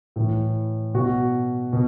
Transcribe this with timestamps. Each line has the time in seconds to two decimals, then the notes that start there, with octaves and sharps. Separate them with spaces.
0.16 A2 E3
0.94 B2 F#4
1.73 B2